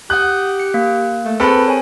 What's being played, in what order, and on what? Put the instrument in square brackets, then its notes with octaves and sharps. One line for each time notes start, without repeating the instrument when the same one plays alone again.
[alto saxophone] G4 [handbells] F#5 D#6 G6 [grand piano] F#6
[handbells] C#7
A#3
[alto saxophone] A3
[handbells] C4 G#4 C5 [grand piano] A4 B5 [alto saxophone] B4
[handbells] A#4 C#5 G#5